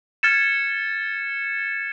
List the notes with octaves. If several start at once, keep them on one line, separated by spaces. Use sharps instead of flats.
F6 G#6 A6 C#7 E7